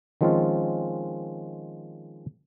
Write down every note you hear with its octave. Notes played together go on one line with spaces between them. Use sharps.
D#3 F3 G#3 C4 C#4 F4